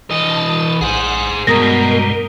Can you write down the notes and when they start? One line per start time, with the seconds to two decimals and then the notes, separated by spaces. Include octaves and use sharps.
0.11 E3 D#5 A5
0.81 A#1 G#4 C5 F#5
1.47 G2 B2 G3 G#3 A#4 A#5 D#6 A#6